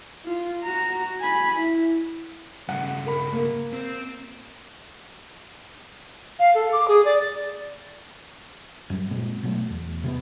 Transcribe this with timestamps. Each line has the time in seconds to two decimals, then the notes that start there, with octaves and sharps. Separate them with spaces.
0.25 F4
0.63 F#4 A#5
1.20 G#5 B5
1.54 E4
2.69 G2 C#3 F#5
3.06 A#4 B5
3.32 A#3
3.73 C4
6.39 F5
6.55 A4
6.73 D6
6.88 G#4
7.05 D5
8.90 F#2 F#3 G3
9.11 A#2 G#3 C4
9.43 B2 F#3 A3
9.70 E2
10.04 C3 G#3 B3